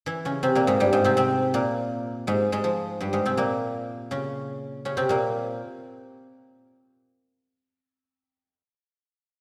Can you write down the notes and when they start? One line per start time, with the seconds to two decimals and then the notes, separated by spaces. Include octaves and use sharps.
0.06 E3 E4
0.25 C#3 C#4
0.43 C3 C4
0.55 A#2 A#3
0.67 G#2 G#3
0.80 G2 G3
0.93 G#2 G#3
1.04 C3 C4
1.17 C3 C4
1.54 A#2 A#3
2.27 G#2 G#3
2.52 G#2 G#3
2.64 F3
3.01 G2 G3
3.13 G#2 G#3
3.26 C3 C4
3.37 A#2 A#3
4.11 C#3 C#4
4.85 C#3 C#4
4.97 C3 C4
5.09 A#2 A#3